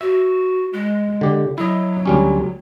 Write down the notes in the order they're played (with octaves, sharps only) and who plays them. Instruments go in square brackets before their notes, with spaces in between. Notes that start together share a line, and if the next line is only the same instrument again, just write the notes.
[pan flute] F#4 [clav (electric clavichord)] E5
[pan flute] G#3
[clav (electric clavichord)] D3 G4
[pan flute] F#3 [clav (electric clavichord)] E4 D#5
[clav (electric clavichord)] D2 G3 C#4